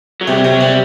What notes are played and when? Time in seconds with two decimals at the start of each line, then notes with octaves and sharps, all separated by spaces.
0.21 F#3
0.28 C3 G3
0.45 C3 F#3
0.61 C3 G3